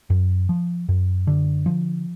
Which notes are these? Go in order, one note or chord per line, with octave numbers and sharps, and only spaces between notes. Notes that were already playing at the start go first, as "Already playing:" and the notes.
F#2
F3
F#2
D3
F3